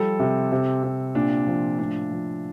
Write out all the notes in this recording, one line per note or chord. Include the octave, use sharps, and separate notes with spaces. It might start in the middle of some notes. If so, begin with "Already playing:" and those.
Already playing: F3 G3 A4
C3
C3
C3
A#2 D4
F3
A2 D4
F3